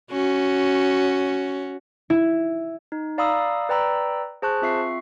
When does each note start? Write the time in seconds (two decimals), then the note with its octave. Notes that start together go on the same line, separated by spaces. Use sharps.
0.11 C#4 F#4
2.10 E4
2.92 D#4
3.18 D5 F5 A#5 B5 D#6 E6
3.69 B4 D5 G5 A#5 B5 E6
4.42 G#4 C5 A5 C#6 F#6
4.62 C4 F4 E5 C#6 C7